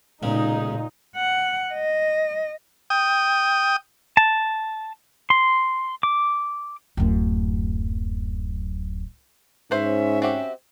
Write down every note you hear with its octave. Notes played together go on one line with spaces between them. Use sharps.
B1 A#2 C#3 G#3 D#4
F#5
D#5
G5 D#6
A5
C6
D6
D1 F#2
G#2 C#4 B4 C5 E5
C4 F#4 G4 E5